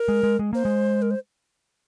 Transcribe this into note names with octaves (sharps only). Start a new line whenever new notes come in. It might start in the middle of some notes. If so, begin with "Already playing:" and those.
Already playing: A#4
G#3
G#3
G#3
A#3 C5
G#3
A#4
C5